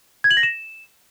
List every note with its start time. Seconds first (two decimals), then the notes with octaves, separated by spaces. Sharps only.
0.24 G#6
0.31 F#7
0.37 A#6
0.43 E7